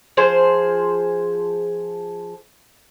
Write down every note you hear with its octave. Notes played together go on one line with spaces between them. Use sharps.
F3 G#4 C5